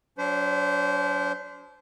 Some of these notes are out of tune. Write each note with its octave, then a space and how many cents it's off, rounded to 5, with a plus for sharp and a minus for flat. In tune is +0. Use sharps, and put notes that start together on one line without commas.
F#3 +0 D4 -40 C5 -20